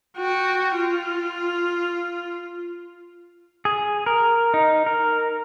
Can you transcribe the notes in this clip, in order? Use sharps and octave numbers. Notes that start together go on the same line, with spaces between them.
F#4 G5
F4
G#4
A#4
D#4
A#4